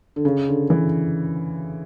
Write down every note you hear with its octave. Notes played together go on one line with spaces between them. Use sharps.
D3
C#3
D3
E3